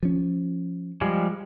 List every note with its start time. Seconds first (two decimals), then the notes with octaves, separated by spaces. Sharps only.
0.03 F3 C#4
1.01 F3 G3 G#3